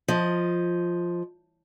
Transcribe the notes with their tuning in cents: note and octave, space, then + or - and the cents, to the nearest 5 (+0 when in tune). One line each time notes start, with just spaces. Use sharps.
F3 +0 D#5 +0